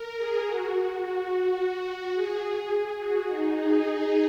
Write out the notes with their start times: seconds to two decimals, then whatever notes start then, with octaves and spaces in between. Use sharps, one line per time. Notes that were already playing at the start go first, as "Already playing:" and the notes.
Already playing: A#4
0.18 G#4
0.46 F#4
0.74 F#4
1.02 F#4
1.30 F#4
1.58 F#4
2.14 G#4
2.99 F#4
3.27 D#4
3.55 G#4